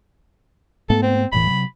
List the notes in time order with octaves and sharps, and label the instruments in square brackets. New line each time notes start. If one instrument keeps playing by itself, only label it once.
[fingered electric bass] G#2 A3 B3 [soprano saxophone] A4
[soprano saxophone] C4
[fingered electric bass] E1 A2 E3 [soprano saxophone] B5
[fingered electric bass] C3 F#3